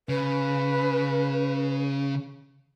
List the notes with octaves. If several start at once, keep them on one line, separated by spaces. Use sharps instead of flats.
C#3 B4